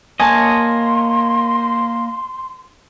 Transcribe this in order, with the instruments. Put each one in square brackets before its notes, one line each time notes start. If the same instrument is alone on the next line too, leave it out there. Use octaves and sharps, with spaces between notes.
[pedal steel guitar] A#3 C#5 D#5 [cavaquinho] G#5 A5 [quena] C6